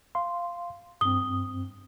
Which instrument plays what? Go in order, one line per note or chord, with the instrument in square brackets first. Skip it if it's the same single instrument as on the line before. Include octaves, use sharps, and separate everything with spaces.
[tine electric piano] F5 C6
[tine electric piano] G2 C4 [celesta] D#6 G7